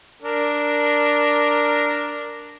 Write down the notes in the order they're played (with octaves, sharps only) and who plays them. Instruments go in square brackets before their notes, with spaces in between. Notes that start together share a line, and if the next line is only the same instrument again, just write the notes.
[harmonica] D4 A#4